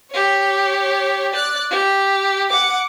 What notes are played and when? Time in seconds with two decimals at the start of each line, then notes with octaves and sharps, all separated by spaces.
0.10 G4 C#5
1.32 D5 F#6
1.71 G4
2.50 F#5 D6